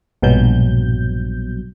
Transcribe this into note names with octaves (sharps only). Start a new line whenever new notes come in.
A#1 G2 B2 F#3 G6